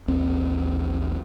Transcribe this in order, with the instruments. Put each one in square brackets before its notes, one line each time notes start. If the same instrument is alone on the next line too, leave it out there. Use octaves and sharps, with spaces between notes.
[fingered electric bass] A1 D#2 C4